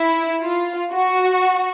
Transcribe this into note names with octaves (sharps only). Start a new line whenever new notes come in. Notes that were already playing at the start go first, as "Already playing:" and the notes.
Already playing: E4
F4
F#4